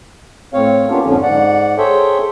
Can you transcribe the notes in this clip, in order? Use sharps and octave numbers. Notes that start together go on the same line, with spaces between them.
A2 C4 C#5 F5
A#3 B3 C#4 D4 F4 G4
F2 G#2 D3 F3 C#4
G#2 D5 F#5
G#4 A4 C5 C#5 E5 G5